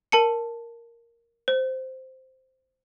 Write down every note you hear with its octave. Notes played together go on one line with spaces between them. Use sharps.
A#4 A5 C#7
C5